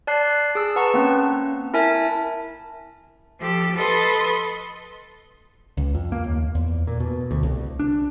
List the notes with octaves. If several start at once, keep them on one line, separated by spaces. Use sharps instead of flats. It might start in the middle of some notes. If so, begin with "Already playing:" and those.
D5 A5 F#6 C7
G#4 E6
B4 F#5 A5 A#5 C#6 E6
A#3 C4 C#4
E4 A#4 E5 G#5 A5
F3 G4 A4
A4 B4 D#5 B5 C6
C#2
F2
A#3
D#2
E2
A#2
B2
D2
C2
D4